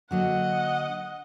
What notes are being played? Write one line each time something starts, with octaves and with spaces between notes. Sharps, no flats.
D3 F#3 A#3 D#5 F#5